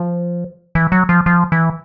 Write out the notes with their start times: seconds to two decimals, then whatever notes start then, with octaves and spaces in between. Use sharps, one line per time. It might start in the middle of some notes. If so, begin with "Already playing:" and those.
Already playing: F3
0.75 E3
0.92 F#3
1.09 F3
1.26 F3
1.52 E3